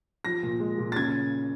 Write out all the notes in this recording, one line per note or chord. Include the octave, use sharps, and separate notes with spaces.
F3 A#6
A#2
G#3
A#2
A6
C#3 G#6